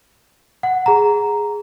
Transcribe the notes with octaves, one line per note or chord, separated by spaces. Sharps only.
F#5
G#4 A#5